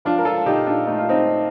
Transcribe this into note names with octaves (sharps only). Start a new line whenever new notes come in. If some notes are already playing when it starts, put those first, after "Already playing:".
F3 D4 F4
A#4
F4 A4
A#2 D#4 G4
D4 F4
A3 D#4
F4
C4 D#4